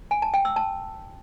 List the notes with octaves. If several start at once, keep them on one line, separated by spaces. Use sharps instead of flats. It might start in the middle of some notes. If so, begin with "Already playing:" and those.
G#5
A5
G5
E6
A5